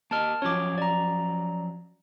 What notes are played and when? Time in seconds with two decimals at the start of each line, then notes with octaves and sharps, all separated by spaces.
0.11 A#3 A#4 D#5 A5 F6
0.42 F3 F#3 C#4 C#5 D6
0.78 D5 A#5